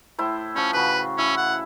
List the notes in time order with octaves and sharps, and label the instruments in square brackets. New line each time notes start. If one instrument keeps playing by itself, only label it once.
[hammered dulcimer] A2 E4 C5
[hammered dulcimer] F3 G5 C#6 [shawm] C#4
[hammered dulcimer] C#3 F#4 [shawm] B4
[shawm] C#4 [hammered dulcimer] E4
[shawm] F#5